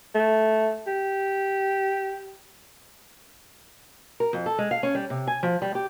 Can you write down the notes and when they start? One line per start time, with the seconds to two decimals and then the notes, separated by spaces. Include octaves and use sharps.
0.15 A3
0.87 G4
4.20 A#4
4.33 F2
4.46 A4
4.59 G#3
4.71 F5
4.83 C#4
4.95 G3
5.10 C3
5.27 G#5
5.43 F3
5.62 G3
5.75 G4